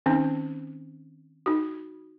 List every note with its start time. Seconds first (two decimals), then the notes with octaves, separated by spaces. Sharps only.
0.06 D#3 C4 C#4 D#4
1.46 D#4 F#4